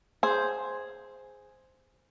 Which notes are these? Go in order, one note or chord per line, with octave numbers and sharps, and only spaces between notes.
G#4 C5